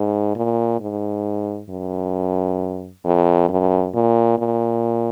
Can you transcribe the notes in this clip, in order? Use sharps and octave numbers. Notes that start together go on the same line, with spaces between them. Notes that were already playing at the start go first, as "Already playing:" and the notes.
Already playing: G#2
A#2
G#2
F#2
F2
F#2
A#2
A#2